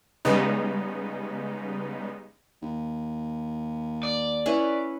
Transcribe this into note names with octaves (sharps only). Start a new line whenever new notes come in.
C#3 G3 G#3 B3 D#4
D#2
D5
C#4 E4 B4